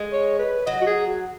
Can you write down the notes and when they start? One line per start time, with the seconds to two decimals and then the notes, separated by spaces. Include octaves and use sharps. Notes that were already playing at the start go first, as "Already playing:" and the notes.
Already playing: G#3
0.13 C#5
0.39 B4
0.66 F#3 D#5
0.82 F#4
0.87 G#4
1.07 F#4